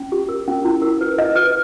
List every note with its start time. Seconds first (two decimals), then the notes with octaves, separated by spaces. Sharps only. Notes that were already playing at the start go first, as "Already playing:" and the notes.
Already playing: C#4
0.12 G4
0.29 A#4
0.48 C#4
0.65 E4
0.82 A#4
1.01 B4
1.19 D#5
1.35 B4